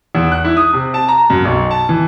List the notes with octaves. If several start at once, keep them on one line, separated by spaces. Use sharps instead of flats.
E2
F#6
E4
D#6
C3
A5
A#5
F#2
B1
A5
E3